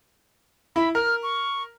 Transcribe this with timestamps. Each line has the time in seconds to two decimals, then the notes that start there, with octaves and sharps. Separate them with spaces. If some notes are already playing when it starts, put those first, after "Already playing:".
0.76 E4 B5
0.95 A#4 F6
1.23 C#6